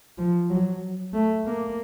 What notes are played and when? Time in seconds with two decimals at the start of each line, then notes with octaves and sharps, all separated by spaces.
0.18 F3
0.50 F#3
1.13 A3
1.45 A#3